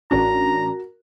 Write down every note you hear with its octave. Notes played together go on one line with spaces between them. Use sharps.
A1 C#4 D4 F#4 A#4 A#5